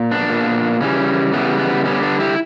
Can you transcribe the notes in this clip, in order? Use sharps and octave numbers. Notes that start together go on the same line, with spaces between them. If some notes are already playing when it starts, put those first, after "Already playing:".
Already playing: A#2
B3 D4
A#2 A#3
C#3 E3 G3 C#4
C#3 E3 G3 B3
B3
D3 G3 B3 C#4
B3 D4
E4 G4